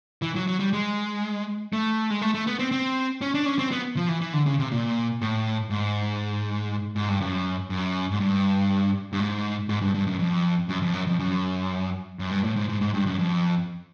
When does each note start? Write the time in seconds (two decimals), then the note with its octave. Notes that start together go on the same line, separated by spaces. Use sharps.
0.22 E3
0.36 F#3
0.47 F#3
0.60 G3
0.73 G#3
1.73 A3
2.10 G#3
2.22 A3
2.34 A3
2.47 B3
2.59 C4
2.72 C4
3.21 C#4
3.34 D4
3.46 C#4
3.59 C4
3.72 B3
3.96 F3
4.09 E3
4.21 E3
4.33 D3
4.46 C#3
4.59 C3
4.72 A#2
5.22 A2
5.70 G#2
6.96 G#2
7.09 G2
7.21 F#2
7.70 F#2
8.11 G#2
8.20 G2
9.13 G2
9.20 G#2
9.69 G#2
9.81 G2
9.94 G2
10.07 F#2
10.19 F2
10.69 F#2
10.82 F2
10.94 F#2
11.07 F2
11.20 F#2
12.19 F#2
12.31 G2
12.44 A2
12.56 G#2
12.69 G#2
12.81 G#2
12.94 G2
13.06 F#2
13.18 F2